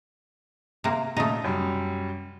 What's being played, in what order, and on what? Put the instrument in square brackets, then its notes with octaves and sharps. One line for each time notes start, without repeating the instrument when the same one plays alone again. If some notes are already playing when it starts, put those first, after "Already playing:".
[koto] C3 A#3
[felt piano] A#2 C#3 D#6 [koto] A3 D#4
[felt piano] F#2 G3